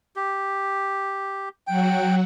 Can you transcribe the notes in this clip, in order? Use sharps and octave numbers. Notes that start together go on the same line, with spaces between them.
G4
F#3 F#4 G5